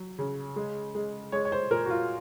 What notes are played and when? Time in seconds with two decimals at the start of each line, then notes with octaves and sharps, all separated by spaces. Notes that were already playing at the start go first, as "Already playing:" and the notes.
Already playing: F#3
0.19 C#3
0.56 G#3
0.95 G#3
1.32 G#3 C#5
1.45 C#5
1.52 C5
1.71 A#2 A#4
1.86 F#4
1.90 F4